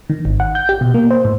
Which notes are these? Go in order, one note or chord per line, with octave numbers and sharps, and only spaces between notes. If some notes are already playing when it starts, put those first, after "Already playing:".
D#3
G#1
F#5
G6
G4
B2
A#3
C5
A2